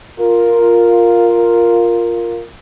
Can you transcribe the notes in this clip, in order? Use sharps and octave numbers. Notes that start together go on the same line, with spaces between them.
F4 A#4